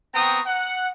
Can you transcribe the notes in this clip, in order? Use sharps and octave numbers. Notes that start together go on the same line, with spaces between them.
B3 C4 G5 A#5 C#6 D#6
F#5